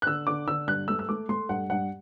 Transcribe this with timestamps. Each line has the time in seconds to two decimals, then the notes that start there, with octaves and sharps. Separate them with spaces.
0.02 F#6
0.07 D3 E6
0.27 D3 D6
0.48 D3 E6
0.67 G2 F#6
0.88 A3 E6
0.99 E6
1.09 A3 D6
1.29 A3 C6
1.49 G2 F#5
1.70 G2 F#5